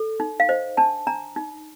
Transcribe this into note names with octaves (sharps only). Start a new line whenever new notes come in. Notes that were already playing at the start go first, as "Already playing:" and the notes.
Already playing: A4
D#4
F5
C5 D#5
D4 A5
D4 A#5
D#4